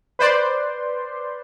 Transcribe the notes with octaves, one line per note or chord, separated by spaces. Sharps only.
B4 C5 D5 C6